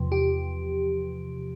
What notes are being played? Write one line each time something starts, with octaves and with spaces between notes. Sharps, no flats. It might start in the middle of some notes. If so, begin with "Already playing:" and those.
Already playing: E2 C3 F3
G4